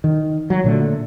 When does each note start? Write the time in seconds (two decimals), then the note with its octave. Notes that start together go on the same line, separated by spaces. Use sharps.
0.04 D#3
0.50 F#3
0.64 A#2 D3 A3